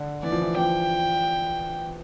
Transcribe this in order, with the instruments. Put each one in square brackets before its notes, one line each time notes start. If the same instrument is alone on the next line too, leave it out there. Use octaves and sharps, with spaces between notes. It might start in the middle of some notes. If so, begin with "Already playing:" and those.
Already playing: [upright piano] D3
[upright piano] E3 [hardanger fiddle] D5
[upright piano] F3
E3
[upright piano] F3 [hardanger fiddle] G5